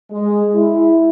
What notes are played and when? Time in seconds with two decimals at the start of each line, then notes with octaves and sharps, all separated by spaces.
0.11 G#3
0.54 E4